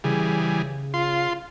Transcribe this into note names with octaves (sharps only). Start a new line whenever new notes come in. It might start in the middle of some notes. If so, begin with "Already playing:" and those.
C#3 E3 G3 G#4
F4 C6